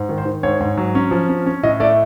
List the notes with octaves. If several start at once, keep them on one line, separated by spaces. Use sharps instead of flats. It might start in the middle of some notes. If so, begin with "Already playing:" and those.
Already playing: G#2
D#3
C5
D#3
G#2 C#5
G#2
F#3
C#4
F3
C#4
C#4
A2 D#5
A3 D5